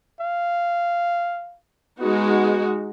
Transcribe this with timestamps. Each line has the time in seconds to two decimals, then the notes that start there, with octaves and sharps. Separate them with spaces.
0.20 F5
2.00 G#3 B3 D#4 F#4